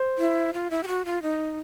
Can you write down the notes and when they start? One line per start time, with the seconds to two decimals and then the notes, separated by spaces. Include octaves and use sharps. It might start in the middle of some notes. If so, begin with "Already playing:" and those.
Already playing: C5
0.18 E4
0.54 F4
0.71 E4
0.83 G4
0.88 F#4
1.05 F4
1.22 D#4